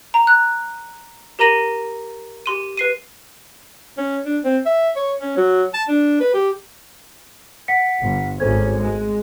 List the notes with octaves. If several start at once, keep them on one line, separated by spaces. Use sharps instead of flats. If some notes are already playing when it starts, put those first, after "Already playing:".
A#5
F#6
G4 A#4 A#5 A#6 D#7 F#7
G4 C6 D#7
B4 C7 D#7
C#4
D4
C4
E5
C#5
C#4
F#3
A5
D4
B4
G4
F#5 B6 C#7
G1
G#1 C#4 A4 C5 G#6
G#3